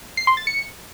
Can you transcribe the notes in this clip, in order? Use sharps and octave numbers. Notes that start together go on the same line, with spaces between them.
C7
C6
A6
C#7